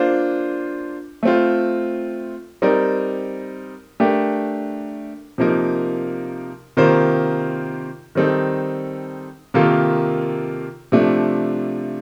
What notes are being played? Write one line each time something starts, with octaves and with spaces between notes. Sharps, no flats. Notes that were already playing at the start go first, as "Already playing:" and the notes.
Already playing: A#3 D4 F4 C5
A3 C4 F4
G3 C4 D#4 A#4 D5
A3 D4 G4 A#4
C3 F3 A#3 D#4 A#4
C3 D#3 A#3 F4 C5
D#3 G3 C4 D#4 A4
C3 D#3 A#3 F4 A4
C3 F3 A3 D4